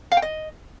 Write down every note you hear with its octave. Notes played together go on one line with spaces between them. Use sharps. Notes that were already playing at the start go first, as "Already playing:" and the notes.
F5
G5
D#5